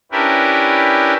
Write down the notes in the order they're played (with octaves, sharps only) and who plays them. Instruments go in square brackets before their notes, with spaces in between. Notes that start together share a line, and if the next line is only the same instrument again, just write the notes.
[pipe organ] C#4 D4 E4 G4 A#4 B4